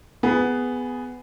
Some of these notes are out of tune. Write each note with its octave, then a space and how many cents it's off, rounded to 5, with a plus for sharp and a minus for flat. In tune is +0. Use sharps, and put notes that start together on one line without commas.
B3 +10 G#4 +0 B5 -30